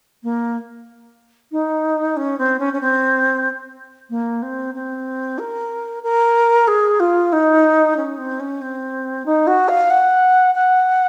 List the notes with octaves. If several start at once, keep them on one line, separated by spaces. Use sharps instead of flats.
A#3
D#4
C#4
C4
C#4
C#4
C4
A#3
C4
C4
A#4
A#4
G#4
F4
D#4
C#4
C4
C#4
C4
D#4
F#4
F5
F#5
F#5